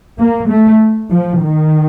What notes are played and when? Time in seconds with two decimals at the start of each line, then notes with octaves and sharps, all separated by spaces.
0.18 A#3
0.49 A3
1.11 F3
1.41 D#3